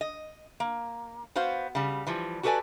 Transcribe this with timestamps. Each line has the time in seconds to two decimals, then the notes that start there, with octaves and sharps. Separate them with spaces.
0.01 D#5
0.60 A#3
1.36 B3 F#4 C5 F5
1.75 C#3 G3
2.07 E3 F3 G3
2.43 F#4 G4 A4 B4 D5 G#5